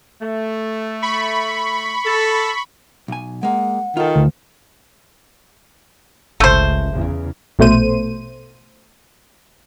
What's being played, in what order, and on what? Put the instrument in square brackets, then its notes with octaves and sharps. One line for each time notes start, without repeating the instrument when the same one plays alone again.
[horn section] A3
[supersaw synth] B5 C#6
[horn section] A4
[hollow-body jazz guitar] B1 G#5
[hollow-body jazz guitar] G#3 A#3 [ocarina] F#5
[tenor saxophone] D#3 [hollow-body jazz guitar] F4 A4
[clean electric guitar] D2
[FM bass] G1 [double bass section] C#2 [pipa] A3 C5
[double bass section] E2 C#3
[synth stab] A#1 B2 A3 C5 D#7